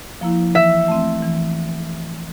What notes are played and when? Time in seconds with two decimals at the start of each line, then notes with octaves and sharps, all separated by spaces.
0.21 F3 A#3 E4
0.55 E3 E5
0.88 A3 C4
1.22 E3